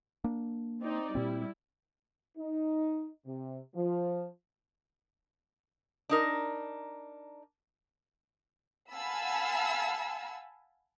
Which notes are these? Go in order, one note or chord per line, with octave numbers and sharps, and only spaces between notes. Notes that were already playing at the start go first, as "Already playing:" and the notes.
A#3 D4
C4 D#4 D5
A#2 G3 C4 E4
D#4
C3
F3
D4 D#4 A#4
F5 F#5 G#5 A5 B5 E6